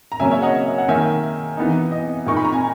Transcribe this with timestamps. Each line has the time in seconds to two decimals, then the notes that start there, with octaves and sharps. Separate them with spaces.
0.12 A#5
0.19 C#3 F#3 A#3 C#4 E5 G#5
0.31 C#5 E5
0.42 D#5 F#5
0.78 F#5
0.88 D#3 A#3 D#4 E5 G#5
1.57 E3 B3 D#4
1.92 D#5
2.26 A#2 A#3 D#4 C#6
2.36 B5
2.45 A#5
2.52 G#5